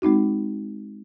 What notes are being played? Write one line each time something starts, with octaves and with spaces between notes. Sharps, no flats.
G#3 C4 D#4 F#4